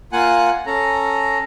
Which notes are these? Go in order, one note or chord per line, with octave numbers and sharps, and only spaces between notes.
A#3 F4 F#5 G#5 F#6
C#4 A4 A#5